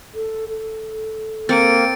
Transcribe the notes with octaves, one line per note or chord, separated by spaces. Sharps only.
A4
A4
A#3 C4 A6 C#7 D7